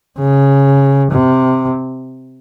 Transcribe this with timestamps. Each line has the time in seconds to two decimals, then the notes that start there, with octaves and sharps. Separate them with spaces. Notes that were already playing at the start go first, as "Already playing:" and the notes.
0.19 C#3
1.12 C3